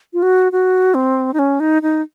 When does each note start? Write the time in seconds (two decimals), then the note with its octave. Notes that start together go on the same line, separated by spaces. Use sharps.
0.13 F4
0.23 F#4
0.52 F#4
0.94 C4
1.34 D#4
1.39 C#4
1.60 D#4
1.82 D#4